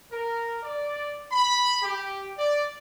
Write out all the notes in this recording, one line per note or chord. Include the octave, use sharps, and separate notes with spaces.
A#4
D5
B5
G4
D5